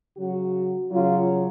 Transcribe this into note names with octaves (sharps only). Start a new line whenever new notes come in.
C#3 F#3 F#4
C#3 F#3 F4